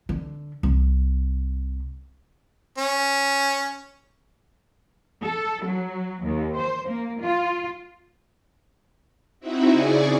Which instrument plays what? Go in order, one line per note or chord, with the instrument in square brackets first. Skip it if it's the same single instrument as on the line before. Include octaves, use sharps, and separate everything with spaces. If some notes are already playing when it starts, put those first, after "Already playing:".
[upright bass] D3
C2
[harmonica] C#4
[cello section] A4
F#3
D#2
C5
A#3
F4
[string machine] C4 D#4 E4 F#4 E5
C#3 G#4 D5 G#5 C#6